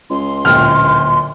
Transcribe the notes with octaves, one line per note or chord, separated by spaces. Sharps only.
C#2 C6
D1 A#2 G5 F6